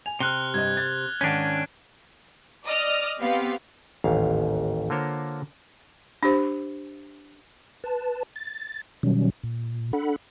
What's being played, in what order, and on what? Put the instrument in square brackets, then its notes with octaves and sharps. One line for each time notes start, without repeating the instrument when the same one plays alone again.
[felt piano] G#5 [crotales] F7
[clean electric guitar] C3 [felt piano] G4 [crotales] F6 F#6 G7
[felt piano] G2 D#5 [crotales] G#6
[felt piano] A6
[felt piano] G#2 D#3 G#6 [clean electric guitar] C#4 D4 [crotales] D#7
[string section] D5 D#5 D#6 F6
B3 C4 G4 B4 F5
[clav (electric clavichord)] A1 D#2 G#2 F5
D3 A#3 F4 A#4 C5 C#5
[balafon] D4 G4 C5
[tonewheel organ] B4 A5
A6
B2 D#3 F#3 G3 C#4
A#2
D4 A4 F#5 B5